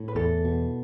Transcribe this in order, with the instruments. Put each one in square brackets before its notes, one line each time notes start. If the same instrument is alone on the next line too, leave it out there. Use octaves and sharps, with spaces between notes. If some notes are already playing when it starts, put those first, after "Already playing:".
Already playing: [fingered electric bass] A2
[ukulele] B4
[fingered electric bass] E2 [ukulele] A4
[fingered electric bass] B2